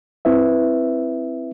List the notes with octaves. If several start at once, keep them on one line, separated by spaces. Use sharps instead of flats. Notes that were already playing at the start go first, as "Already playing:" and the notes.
C4 E4 B4 E5